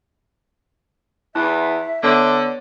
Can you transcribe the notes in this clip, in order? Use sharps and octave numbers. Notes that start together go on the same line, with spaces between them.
E2 E4 E5 A5 F#6
D3 B3 C#5 D5